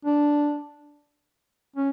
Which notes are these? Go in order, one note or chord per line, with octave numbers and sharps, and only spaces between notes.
D4
C#4